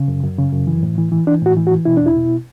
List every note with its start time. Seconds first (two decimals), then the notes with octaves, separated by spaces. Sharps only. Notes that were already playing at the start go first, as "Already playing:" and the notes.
Already playing: C#3
0.08 F#2
0.23 F#2
0.39 C#3
0.52 F#2
0.67 E3
0.83 A2
0.98 E3
1.12 E3
1.27 E3 D4
1.42 A2 F#4
1.57 E3
1.67 F#4
1.71 E3
1.85 B2 E4
1.97 E2 D4
2.06 E4
2.16 B2